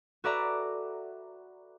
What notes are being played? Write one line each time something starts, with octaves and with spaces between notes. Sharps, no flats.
F#4 A4 B4 D5 E5 A#5